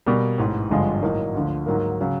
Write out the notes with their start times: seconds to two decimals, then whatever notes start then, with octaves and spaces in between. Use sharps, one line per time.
0.06 B2 G3 A#3
0.38 A1 G#2 E3
0.70 G#1 G2 D3 F3 G#3
1.02 A2 F#3 A#3 D#4
1.34 D2 D3 F3
1.66 G#2 D#3 F#3 A#3
2.00 C#3 F#3